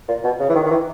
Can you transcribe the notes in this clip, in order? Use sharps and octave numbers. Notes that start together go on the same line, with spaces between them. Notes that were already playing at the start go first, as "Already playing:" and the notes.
A#2
B2
C#3
E3
D#3
D#3
E3